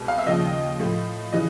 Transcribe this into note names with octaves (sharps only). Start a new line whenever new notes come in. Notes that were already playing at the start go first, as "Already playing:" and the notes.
Already playing: C2 B2 G#3 B3
F5
E5
D#2 C#3 F3 D#5
A2 F3 A3
C#3 E3 D#5